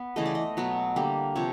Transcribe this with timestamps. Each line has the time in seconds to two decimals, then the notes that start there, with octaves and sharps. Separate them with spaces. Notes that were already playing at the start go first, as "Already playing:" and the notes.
Already playing: B3 B4
0.16 C#3 E3 A3 D#5
0.26 D5
0.35 D#5
0.57 B2 F#3 B3
0.96 D3 G3 A#3
1.35 C3 F3 C#5